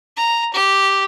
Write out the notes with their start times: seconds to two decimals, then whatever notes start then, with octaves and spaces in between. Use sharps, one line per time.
0.17 A#5
0.53 G4